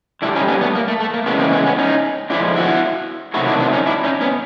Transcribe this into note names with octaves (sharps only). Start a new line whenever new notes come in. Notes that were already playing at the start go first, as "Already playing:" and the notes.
D3 G3 D4 E4
C#4 D#4
B3 C#4
A3 B3
A#3
A3
A3
A#3
C#3 E3 G#3 A3 B3
A#3 C4
B3 C#4
B3 C#4
C#4 D#4
D3 F3 G#3 D4 E4
E4 F#4
C3 D#3 F#3 A3 E4 F#4
D4 E4
C4 D4
C#4 D#4
D4 E4
C#4 D#4
B3 C#4